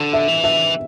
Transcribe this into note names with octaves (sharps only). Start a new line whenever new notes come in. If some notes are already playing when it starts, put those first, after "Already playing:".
Already playing: D3
E5
E3
E5